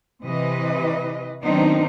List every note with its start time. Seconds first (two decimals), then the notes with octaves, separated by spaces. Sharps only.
0.22 C3 E3 B4 D#5
1.44 D#3 F#3 B3 C4 D4 D#4